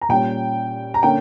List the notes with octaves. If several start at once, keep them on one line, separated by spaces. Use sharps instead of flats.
A#5
A#2 G3 C#4 G5
A#5
D3 A#3 C#4 G5